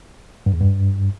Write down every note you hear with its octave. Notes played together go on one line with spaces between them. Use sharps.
G2
E2
G2